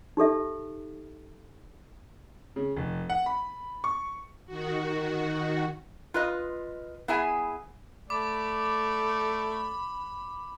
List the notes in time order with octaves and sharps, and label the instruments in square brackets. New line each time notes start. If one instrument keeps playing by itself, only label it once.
[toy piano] D#4 G4 A4 E5
[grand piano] C#3
F1
F#5
B5
C#6
[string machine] D#3 F#4
[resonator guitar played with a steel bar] F4 B4 D#5
B3 E4 G#4 E5 G#5
[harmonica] A3 [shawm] D5 [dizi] B5 [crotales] D6